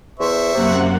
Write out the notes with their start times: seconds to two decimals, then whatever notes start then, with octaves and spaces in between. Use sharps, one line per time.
0.20 E2 C5 E5 C#6
0.54 F#2 C3 A#3 F#5